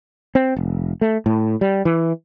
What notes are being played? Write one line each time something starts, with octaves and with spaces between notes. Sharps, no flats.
C4
F1
A3
A2
G3
E3